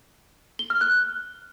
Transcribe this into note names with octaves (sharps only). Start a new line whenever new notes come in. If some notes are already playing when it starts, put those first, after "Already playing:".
G7
F6
F#6